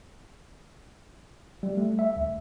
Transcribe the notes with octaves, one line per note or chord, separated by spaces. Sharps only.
G3
A3
E5
D2